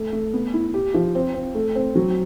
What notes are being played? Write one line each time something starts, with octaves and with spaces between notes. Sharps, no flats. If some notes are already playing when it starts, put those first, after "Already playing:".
Already playing: A3
A3
B3
E4
G4
F3
C4
C4
A3
C4
F#3